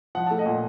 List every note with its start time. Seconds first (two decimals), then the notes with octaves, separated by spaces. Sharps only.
0.15 F3 F#5
0.26 A3 A5
0.38 D#5 F#5
0.46 A#2